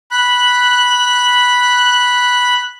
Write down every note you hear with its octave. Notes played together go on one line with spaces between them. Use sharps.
B5 F#6